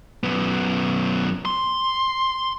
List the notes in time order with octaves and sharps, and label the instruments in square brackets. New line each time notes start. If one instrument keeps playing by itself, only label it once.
[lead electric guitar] F#2 B3
C6